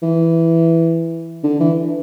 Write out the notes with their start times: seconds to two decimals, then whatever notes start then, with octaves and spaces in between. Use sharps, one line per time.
0.02 E3
1.43 D3
1.60 E3